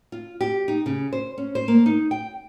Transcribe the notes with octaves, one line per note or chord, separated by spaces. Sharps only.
F4
G4
D#4
C#3
C5
C#4
C5
A#3
D#4
G5